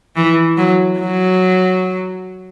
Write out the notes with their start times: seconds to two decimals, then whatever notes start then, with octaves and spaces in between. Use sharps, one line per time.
0.16 E3
0.57 F#3
0.99 F#3